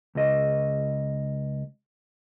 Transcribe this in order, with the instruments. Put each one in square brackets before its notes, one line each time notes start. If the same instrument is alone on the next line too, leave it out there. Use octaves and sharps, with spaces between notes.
[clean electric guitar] C#2 D#5